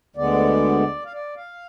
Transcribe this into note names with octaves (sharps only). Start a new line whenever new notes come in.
D2 D3 G#3 B3 D5
F5
D5
F5